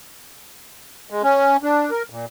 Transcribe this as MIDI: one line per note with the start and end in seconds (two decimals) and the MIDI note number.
1.10 1.22 56
1.23 1.57 61
1.63 1.90 62
1.91 2.03 70
2.10 2.25 46